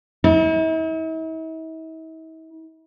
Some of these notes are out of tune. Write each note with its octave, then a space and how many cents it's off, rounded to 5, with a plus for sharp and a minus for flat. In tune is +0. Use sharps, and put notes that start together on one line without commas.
E4 -45